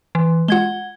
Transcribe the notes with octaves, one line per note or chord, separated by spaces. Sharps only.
E3
G#3 F4 F#5 G#6 G7